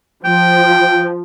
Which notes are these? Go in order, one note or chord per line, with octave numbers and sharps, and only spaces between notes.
F3 G5